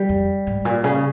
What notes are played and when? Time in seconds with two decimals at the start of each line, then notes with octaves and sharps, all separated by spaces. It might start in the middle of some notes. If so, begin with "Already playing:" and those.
Already playing: G3
0.09 F2
0.47 G#2
0.65 A#2
0.84 C#3